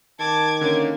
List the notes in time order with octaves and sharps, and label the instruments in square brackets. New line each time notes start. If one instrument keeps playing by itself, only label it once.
[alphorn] D#3 [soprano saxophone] A5 [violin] D6 G#6
[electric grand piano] D3 C#4 [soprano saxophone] A#3